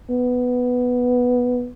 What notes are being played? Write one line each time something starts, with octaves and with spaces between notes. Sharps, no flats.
B3